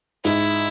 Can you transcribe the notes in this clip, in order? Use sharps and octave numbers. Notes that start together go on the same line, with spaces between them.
G#2 E4